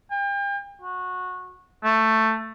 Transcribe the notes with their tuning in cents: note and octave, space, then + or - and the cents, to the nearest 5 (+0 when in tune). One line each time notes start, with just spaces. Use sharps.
G5 +40
F#4 -20
A3 +10